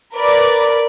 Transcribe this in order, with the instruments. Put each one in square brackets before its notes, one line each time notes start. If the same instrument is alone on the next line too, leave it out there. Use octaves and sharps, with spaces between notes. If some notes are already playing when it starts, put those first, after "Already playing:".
[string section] A#4 B4 D5